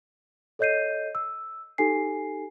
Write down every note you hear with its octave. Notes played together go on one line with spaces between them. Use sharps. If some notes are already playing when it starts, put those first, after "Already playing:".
A4 C#5 D#5 G6 C7 D#7
E6
D#4 G4 A4 G#5 C7